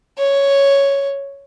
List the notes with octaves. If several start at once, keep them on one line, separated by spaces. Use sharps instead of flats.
C#5